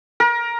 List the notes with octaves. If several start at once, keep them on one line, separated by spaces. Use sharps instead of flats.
A#4